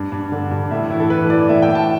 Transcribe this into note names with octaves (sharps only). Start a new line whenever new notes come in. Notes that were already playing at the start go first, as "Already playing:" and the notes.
Already playing: G2
G2
D3
G2
A2 E5
E3 E4
A4
E3 B4
E3 D5
A2 E5
G5
A2
A5